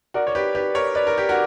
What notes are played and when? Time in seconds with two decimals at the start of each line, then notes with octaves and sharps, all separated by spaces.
0.14 F#4 A#4 D5
0.27 C#5
0.35 G4 B4
0.55 G4 B4
0.75 A#4 C#5
0.95 B4 D5
1.07 A#4
1.18 G4
1.29 F#4 A#4